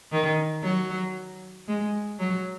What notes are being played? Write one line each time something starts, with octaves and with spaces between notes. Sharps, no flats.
D#3
F#3
G#3
F#3